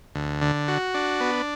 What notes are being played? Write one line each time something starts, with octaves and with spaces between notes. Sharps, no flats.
D2
D3
F#4
D4
B3